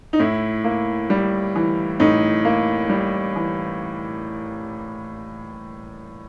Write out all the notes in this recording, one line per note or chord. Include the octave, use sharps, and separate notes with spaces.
D#4
A2 E4
A#3
G3
E3
A2 D#4
A#3
G3
E3